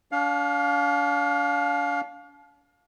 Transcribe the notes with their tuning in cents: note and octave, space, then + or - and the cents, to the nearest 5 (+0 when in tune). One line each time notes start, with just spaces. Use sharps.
D4 -40 F5 +20